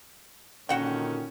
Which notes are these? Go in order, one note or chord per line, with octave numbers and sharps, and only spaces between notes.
A#2 D3 D#3 C#4 F#4 F#5 G5